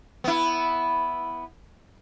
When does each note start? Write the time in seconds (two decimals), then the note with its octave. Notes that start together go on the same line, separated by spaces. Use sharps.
0.24 B3 E4